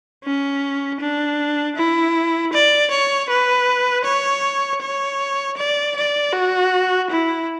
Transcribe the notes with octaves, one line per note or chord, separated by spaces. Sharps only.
C#4
D4
E4
D5
C#5
B4
C#5
C#5
D5
D5
F#4
E4